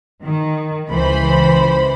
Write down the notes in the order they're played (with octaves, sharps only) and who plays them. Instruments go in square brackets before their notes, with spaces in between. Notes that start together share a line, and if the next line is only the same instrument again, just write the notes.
[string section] D#3
C#2 E3 C5 B5